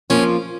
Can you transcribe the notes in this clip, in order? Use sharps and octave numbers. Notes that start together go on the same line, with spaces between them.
F3 A#3 C#4 F4